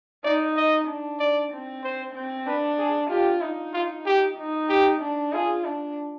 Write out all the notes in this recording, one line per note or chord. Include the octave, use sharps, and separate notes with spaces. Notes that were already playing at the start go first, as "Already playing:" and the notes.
D#4 D5
D#5
D4
D5
C4
C5
C4
D4 B4
G#4
F4 G4
D#4
F4
G4
D#4
G4
D4
F4 G#4
D4